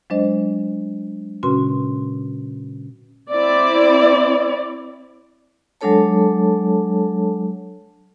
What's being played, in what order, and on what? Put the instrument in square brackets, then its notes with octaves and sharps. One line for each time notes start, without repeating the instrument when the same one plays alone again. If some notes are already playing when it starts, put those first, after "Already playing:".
[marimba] F#3 G#3 D4 C5 D#5
A#2 C#3 C#4 F#4 B4 C6
[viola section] C4 E4 D5
[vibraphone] F#3 G#3 D4 A4 C#5 A5